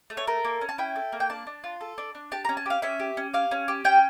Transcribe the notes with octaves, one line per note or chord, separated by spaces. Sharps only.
A3
C#5
A4 A#4
A#3
C#4
A5
E4 G5
A4
A#3
G5
D4 A5
D4
F4
A4
D4
D4
G4 A5
A#5
C#4
A5
G4 F5
C#4 E5
G4
C#4
G4 F5
C#4
G4
C#4 G5